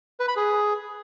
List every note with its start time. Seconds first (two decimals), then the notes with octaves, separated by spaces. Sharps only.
0.20 B4
0.28 B5
0.36 G#4